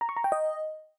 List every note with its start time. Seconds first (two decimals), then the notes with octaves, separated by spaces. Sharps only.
0.01 A#5
0.09 C#6
0.17 A#5
0.24 G5
0.32 D#5